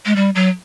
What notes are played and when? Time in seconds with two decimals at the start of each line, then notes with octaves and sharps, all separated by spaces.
0.06 G#3
0.16 G3
0.35 F#3